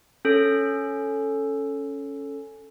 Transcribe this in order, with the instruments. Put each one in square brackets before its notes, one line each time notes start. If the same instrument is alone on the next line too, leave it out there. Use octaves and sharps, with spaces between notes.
[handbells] C#4 A4